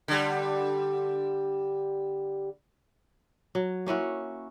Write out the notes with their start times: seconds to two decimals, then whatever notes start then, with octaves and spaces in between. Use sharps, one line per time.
0.08 D3 G3
3.55 F#3
3.86 A#3 C#4 E4 F#4